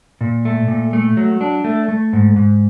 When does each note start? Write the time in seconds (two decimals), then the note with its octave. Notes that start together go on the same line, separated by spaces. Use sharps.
0.21 A#2
0.45 A3
0.68 A#2
0.93 A3
1.17 F#3
1.41 D4
1.64 A3
1.88 A3
2.13 G#2
2.36 G#2